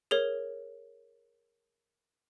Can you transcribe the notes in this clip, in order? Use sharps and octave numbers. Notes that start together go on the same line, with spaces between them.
G#4 A#4 C#5